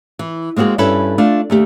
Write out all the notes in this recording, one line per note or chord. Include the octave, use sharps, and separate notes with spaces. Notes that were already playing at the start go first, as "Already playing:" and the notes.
E3
G#3 A#3 C4 F#4 G#4
G2 C#4 E4 A4 B4 G5
A3 D4 F4
D#2 A3 G4